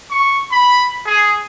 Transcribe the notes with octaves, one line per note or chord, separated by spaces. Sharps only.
C#6
B5
G#4